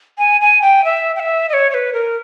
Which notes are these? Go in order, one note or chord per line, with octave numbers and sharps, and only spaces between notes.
G#5
G#5
G5
E5
G5
E5
D#5
C#5
C#5
B4
A#4